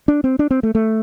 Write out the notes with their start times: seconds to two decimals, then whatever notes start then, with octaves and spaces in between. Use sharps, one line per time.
0.08 D4
0.24 C4
0.39 D4
0.51 C4
0.63 A3
0.75 A3